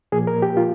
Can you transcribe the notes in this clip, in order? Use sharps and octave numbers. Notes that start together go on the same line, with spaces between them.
A#2 F3 A#3 G#4
A#4
G4
F4